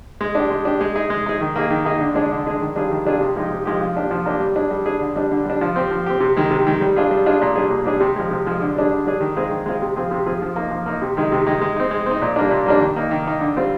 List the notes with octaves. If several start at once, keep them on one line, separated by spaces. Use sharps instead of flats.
G#3
D4 G4
G#3
D4 G4
G#3
D#4 G#4
G#3
D#4 G#4
D#3
A#3 D#4 G#4
D#3
A#3 D#4 G#4
D3
G#3 D4 G#4
D3
G#3 D4 G#4
D#3
G3 D4 F4 G#4
D#3
G3 D4 F4 G#4
C3
F3 G#3 D#4 G4
C3
F3 G#3 D#4 G4
F3
A#3 D4 G4
F3
A#3 D4 G4
G3
D4 G#4
G3
D4 G#4
D3
G3 D4
D3
G3 D4
F3
C4 G4
F3
C4 G4
C3
D#3 G#3
C3
D#3 G#3
G3
D4 F4 G#4
G3
D4 F4 G#4
A#2
G3 D4 G#4
A#2
G3 D4 G#4
C3
F3 G#3
C3
F3 G#3
D3
G3 D4 G#4
D3
G3 D4 G#4
D#3
G#3 C4 F4 G#4
D#3
G#3 C4 F4 G#4
C3
F3 C4 F4 G#4
C3
F3 C4 F4 G#4
F3
A#3 D#4
F3
A#3 D#4
C3
D#3 G#3 D#4
C3
D#3 G#3 D#4
G#3
C4 D#4
G#3
C4
D#4
A#2
G3 A#3 D4
A#2
G3 A#3 D4
D#3
A#3 D#4
D#3
A#3 D#4
D3
G3 C4 F4